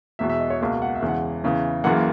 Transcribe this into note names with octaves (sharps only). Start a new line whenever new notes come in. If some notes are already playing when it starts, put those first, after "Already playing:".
E1 E2 B2 E5
E5
D#5
C#5
C#2 B2 A#3 E5
F#5
E5
E1 E2 C#3 E3
F#5
E2 C#3 E3
F#1 F#2 E3 A#3 F#5